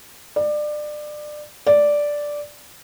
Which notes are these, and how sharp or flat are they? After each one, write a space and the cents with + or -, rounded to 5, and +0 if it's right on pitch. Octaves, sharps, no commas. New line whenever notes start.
D5 +25
D5 -5